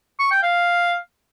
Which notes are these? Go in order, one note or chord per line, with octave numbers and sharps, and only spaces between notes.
C#6
G5
F5